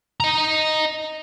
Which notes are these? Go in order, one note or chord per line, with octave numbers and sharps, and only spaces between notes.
D#5 A#5